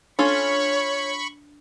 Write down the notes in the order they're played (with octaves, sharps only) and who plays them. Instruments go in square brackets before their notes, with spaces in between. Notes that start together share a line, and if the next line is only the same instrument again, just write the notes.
[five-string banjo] C#4 F4 A4 [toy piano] D4 [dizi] C#5 [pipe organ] B5 C#6